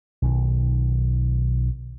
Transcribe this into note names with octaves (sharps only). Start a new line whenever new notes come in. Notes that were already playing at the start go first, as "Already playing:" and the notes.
B1 D#3